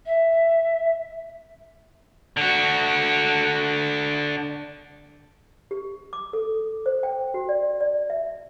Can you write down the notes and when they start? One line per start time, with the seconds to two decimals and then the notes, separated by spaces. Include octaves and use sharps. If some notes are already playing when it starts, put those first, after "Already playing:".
0.06 E5
2.37 D3 F#4
5.71 G4
6.13 D6
6.33 A4
6.86 C5
7.03 G5
7.34 F#4
7.49 D5
7.81 D5
8.10 E5